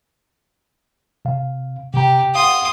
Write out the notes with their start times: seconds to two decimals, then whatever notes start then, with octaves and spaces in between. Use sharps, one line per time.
1.25 C3 F5
1.94 C3 G4 A#5
2.35 F5 F#5 C6 D#6